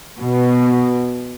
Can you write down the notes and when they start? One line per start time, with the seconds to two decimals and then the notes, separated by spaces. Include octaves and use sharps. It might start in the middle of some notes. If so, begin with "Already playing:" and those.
0.20 B2